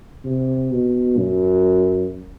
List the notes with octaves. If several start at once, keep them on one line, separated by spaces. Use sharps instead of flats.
C3
B2
F#2